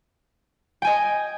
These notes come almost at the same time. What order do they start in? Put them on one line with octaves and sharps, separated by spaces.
G5 G#5 D#5